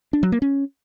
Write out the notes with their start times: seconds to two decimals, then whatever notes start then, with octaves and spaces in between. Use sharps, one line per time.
0.13 D4
0.23 F#3
0.32 A#3
0.42 C#4